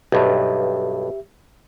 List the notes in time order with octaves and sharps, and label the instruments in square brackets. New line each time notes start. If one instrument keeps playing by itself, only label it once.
[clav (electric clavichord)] B1 G2 [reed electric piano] G4 E5